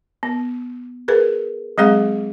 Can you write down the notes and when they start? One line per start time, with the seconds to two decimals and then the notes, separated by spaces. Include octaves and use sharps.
0.23 B3
1.08 G#4 A#4 B4
1.78 F#3 G#3 C4 G#4 F5 F#5